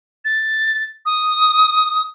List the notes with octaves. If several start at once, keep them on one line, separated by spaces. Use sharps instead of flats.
A6
D#6